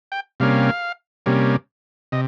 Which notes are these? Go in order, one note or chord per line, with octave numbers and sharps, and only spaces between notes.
G5
C3 G3 A#3 C#4 F5
C3 G3 A#3 C#4
C3 D#5